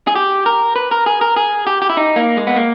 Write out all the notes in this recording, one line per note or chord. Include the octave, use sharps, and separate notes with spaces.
G#4
G4
A#4
B4
A#4
G#4
A#4
G#4
G4
G4
E4
D#4
A#3
G#3
B3
A#3